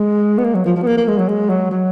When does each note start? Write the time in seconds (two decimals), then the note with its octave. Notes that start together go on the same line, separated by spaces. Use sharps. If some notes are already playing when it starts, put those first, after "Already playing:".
Already playing: G#3
0.38 B3
0.44 A#3
0.55 F#3
0.65 F3
0.76 F3
0.82 B3
0.87 A#3
0.97 A#3
1.08 G#3
1.18 F#3
1.29 G#3
1.50 F#3
1.71 F#3